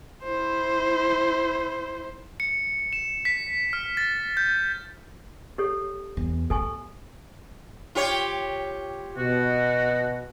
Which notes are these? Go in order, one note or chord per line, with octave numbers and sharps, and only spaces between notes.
E4 C5
C#7
E7
B6
F6
A6
G6
G4 A4 C#5
E2
A2 A4 G#5 C#6
F4 G4 C#5
B2 F#4